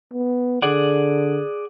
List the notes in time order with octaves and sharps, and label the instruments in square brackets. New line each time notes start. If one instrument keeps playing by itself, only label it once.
[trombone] B3
[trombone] D3 [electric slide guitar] G#4 D5 F#5